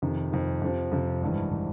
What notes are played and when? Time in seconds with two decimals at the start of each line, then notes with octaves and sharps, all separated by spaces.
0.02 F2 C3 D#3
0.32 F2 C3 D#3
0.62 F2 C3 F3
0.91 F2 C3 F3
1.22 G#1 G2 E3
1.51 E3